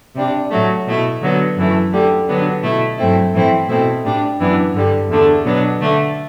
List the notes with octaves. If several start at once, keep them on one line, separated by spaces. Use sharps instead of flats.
C3 G3 D4
A2 F#3 A3
B2 A3 E4
D3 F#3 B3
F#2 E3 A3
D2 D3 G3
D3 F#3 B3 D4
B2 A3 E4
G2 F#3 A3 C4 E4
A2 E3 A3 C4 E4
B2 A3 C4 E4
A2 G3 D4
F#2 E3 B3 D4
G2 D3 G3
E2 D3 A3 D4
B2 F#3 B3 D4
D3 A3 D4